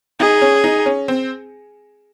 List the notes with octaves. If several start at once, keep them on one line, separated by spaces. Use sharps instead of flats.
D#4 G#4
C#4
D#4
C#4
C4